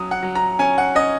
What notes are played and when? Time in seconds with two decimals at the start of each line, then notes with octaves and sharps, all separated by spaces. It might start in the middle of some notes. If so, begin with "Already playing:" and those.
Already playing: F#3 C#4 D#6
0.11 F#5
0.23 F#3
0.35 A#5
0.59 C#4 G#5
0.78 F#5
0.95 C#4 D#5